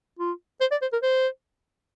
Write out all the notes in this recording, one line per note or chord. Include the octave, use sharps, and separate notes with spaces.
F4
C5
D5
C5
A#4
C5